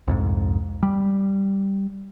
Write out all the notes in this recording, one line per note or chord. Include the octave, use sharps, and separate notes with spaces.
C2 F2 G#2
G3